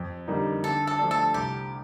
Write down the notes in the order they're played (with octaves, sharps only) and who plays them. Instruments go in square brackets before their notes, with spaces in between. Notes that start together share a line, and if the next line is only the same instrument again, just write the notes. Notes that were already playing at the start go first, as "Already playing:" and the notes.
Already playing: [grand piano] F2
D3 G3 A#3 D#4
[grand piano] D3 [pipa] A4
[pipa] A4
[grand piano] F3 A3 D4
[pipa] A4
[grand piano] C2 [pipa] G4